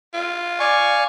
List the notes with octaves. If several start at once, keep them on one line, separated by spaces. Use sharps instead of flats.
F4
D5 F5 G#5 C#6